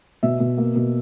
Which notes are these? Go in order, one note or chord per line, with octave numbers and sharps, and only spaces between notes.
B2 E5
B2
A#3
B2